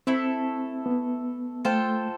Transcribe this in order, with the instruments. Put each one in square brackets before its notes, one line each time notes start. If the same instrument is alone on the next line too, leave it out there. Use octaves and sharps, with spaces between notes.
[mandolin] A3 E4 A4 [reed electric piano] C4
[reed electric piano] B3
[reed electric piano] A3 [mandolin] F4 A4 C5 G5